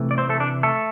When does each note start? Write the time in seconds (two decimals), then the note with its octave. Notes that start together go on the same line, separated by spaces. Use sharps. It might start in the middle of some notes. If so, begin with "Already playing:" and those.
Already playing: C3 E3 A3
0.11 D5
0.18 C4 C5
0.29 A3 A4
0.40 D4
0.63 A3 A4